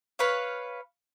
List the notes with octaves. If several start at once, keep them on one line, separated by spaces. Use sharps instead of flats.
B4 C#5 F5